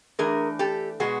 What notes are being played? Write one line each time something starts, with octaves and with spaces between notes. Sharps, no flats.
E3 A3 D4 G#4 A#4
G4 A4
B2 G#3 B3 F#4 G#4